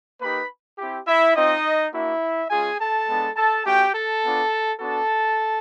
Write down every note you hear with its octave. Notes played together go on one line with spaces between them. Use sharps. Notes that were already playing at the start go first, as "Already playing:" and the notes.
A#3 D#4 G4 B4 B5
C4 E4 G4
E4 E5
C4 D#4 F4 D#5
A#3 D4 E4 F#4 E5
G#3 C#4 F4 G#4 G#5
A4 A5
G#3 B3 D4
A4 A5
A3 C#4 F#4 G4 G5
A4 A5
B3 D4 F4
B3 D4 F#4 A4 A5